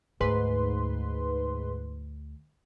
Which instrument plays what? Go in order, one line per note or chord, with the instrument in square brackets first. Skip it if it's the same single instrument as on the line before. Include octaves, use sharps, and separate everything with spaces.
[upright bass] D2 [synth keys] G#2 B4 C6